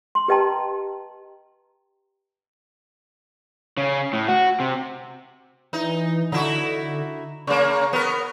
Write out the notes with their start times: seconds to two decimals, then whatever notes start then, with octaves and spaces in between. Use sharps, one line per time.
0.15 C6
0.28 G4 B4 D#5 G5 A5 A#5
3.77 C#3
4.13 A2
4.28 F#4
4.60 C3
5.73 E3 D#4
6.32 D3 D#4 E4 F#4
7.47 C#3 A#3 C#6
7.93 B3 A#4